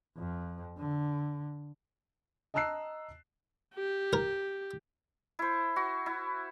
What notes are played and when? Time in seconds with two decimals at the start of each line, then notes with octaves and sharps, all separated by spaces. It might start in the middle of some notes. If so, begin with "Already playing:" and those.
0.18 F2
0.78 D3
2.54 D#5 A5 A#5 E6 F#6 C7
3.74 G4
4.13 A#4
5.39 E4 C5
5.76 F#4
6.06 E4